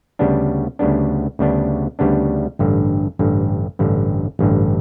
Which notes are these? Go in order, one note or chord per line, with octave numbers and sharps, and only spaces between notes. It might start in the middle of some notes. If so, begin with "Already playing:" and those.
D2 C#3 G3 B3 D4
D2 C#3 G3 B3 D4
D2 C#3 G3 B3 D4
D2 C#3 G3 B3 D4
A1 G2 D3
A1 G2 D3
A1 G2 D3
A1 G2 D3